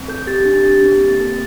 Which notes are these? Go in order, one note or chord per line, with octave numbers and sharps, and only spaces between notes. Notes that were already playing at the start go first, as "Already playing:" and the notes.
Already playing: C4
A4 G6
G4 A6
D4
G4
C4
A#3 A6
A4